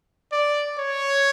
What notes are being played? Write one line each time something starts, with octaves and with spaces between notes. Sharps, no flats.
D5
C#5